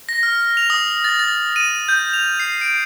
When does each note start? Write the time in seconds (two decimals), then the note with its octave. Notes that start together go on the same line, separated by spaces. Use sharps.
0.09 A#6
0.23 F6
0.57 F7
0.70 D#6
1.04 A6
1.19 A6
1.56 D#7
1.88 G6
2.13 F7
2.40 C7
2.61 D7